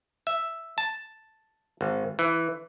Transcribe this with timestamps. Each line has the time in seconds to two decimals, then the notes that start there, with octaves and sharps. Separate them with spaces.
0.27 E5
0.78 A5
1.81 G#1
2.19 E3